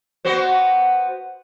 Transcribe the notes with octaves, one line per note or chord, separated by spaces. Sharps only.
B3 F#4 C5